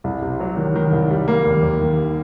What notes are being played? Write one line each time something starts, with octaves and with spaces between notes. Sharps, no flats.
C2
C3
F#3
D#3
D#3
C2
G3
A#3
D#2
D#2
D#3